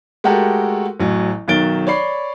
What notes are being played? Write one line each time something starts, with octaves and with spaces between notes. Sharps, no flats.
G#3 A3 F#4 G4 A4 A#4
A1 F#3
B1 D#3 F#3 A6 D7 G7
C#5 D5 B5 C7